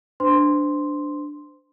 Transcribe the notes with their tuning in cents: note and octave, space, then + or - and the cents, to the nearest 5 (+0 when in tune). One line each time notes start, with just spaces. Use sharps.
D4 +0 C5 -30 C6 +0